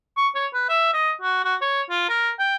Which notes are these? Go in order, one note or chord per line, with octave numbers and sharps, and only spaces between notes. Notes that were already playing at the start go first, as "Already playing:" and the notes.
C#6
C#5
B4
E5
D#5
F#4
F#4
C#5
F4
A#4
G5